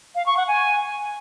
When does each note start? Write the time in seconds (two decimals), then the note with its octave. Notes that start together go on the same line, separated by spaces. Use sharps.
0.15 F5
0.26 C#6
0.37 F#5
0.48 G#5